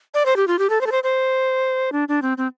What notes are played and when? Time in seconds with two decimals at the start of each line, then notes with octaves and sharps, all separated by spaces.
0.14 D5
0.26 C5
0.36 G4
0.47 F4
0.59 G4
0.70 A4
0.81 C5
0.87 A4
0.92 C5
1.03 C5
1.92 D4
2.08 D4
2.22 C4
2.38 C4